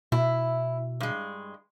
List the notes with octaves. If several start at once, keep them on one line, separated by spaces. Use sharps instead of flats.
B2 E4
G2 G#3